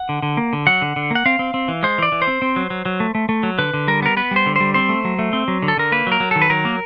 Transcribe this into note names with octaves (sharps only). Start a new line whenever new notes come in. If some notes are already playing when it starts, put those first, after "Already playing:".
Already playing: F#5
D3
D3
A#3
D3
F#3 F#5
D3
D3
A#3 F#5
C4 F5
C4
C4
E3
G#3 C5
E3 D5
E3
C5
C4
C4
F#3
F#3
F#3
A3
A3
A3
F#3
D3 B4
D3
G3 A#4
B3 A#4
B3 B4
G3 C5
D3
G3 C5
C4 C5
A3
F#3
A3
C4
F#3
D3
A4
D3 A#4
A#3 B4
F#3
A#4
F#3
D#3 A4
B4
F#3 A#4
A#3